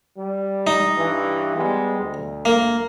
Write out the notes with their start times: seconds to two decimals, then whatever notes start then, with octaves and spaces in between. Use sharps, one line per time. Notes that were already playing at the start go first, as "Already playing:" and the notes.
0.18 G3
0.67 D#4
0.98 G2 E3
1.57 G3 G#3 B3
2.01 D2
2.45 A#3